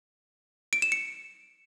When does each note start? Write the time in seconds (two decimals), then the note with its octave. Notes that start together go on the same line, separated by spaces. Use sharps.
0.73 D7
0.82 E7
0.92 C#7